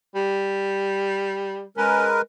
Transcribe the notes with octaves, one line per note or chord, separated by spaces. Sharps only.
G3
G#3 C#4 A#4 B4